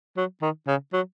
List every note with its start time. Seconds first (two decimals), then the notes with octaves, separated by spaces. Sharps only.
0.17 F#3
0.42 D#3
0.67 C#3
0.93 F#3